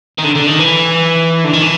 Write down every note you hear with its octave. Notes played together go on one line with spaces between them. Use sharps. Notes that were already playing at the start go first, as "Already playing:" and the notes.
D#3
D3
D3
D#3
E3
D3
D#3
E3